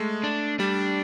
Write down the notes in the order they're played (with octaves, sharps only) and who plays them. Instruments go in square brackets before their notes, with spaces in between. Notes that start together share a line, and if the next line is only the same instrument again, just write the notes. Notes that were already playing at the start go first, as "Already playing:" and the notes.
Already playing: [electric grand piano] G#3 A3
[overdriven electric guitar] D4
[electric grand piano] G3 [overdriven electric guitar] D4